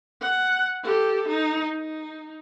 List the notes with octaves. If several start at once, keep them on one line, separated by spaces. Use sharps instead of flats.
F#5
G4 A4
D#4
D#4